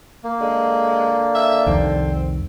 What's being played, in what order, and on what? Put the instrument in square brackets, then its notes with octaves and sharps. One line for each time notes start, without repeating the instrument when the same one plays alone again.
[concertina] A#3
[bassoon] D3 [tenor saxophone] G#3
[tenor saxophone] E5
[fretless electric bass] C2 F2 D#3 [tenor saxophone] C4